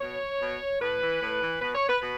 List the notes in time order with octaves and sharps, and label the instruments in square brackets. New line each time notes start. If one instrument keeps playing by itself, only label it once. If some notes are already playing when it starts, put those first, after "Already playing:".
[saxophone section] B2 C#5
B2
A2 B4
E3
A2
E3
B2 B4
C#5
B4
B2 B4